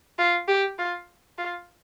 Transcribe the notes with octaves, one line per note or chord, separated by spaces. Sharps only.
F4
G4
F4
F4